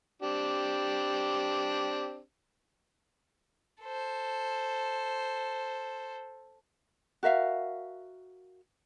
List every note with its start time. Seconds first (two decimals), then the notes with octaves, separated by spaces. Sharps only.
0.22 C4 D4 G4
3.83 A4 C5
7.23 F#4 A#4 E5 F5